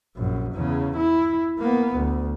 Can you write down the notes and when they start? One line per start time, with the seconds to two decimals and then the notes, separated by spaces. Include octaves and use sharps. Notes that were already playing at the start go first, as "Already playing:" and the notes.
0.16 A#1 F#2
0.54 E2 C#3
0.97 E4
1.59 A#3 B3
1.96 D2